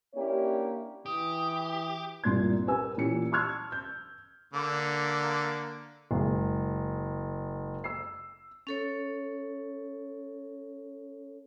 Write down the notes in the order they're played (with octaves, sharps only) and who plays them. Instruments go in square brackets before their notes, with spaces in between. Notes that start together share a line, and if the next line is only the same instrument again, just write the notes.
[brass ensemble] A#3 C#4 D4 E4 G4 C#5
[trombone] E3 [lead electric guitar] G4 [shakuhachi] D#6
[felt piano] C2 G2 A#2 C6 G#6
G4 A#4 B4 G#5 E6
A#2 E3 C#4 G4 C#7
A5 C6 C#6 E6 F6 G#6
G6
[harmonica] D3 A#3
[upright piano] F#1 G#3
E6 C7
[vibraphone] C#4 A4 C#5